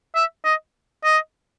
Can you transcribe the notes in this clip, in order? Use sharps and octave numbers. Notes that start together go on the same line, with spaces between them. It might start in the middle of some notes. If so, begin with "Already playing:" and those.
E5
D#5
D#5